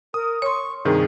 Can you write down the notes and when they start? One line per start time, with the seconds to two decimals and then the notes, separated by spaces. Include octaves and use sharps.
0.14 A#4 D#6
0.42 C#5 C6 C#6
0.85 G2 C3 D#3 G#4